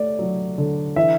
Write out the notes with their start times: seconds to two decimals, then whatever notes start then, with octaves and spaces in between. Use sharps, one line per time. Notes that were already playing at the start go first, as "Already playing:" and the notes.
Already playing: A3 D5
0.19 F#3
0.58 D3
0.96 E3 E5